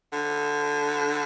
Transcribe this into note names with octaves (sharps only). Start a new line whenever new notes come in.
D3